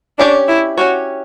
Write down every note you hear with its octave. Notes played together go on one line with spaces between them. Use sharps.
C#4 D4 G4 C#5
E4
C#4 F#4 G4 C#5